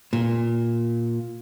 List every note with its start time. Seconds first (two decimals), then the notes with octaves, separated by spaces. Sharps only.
0.13 A#2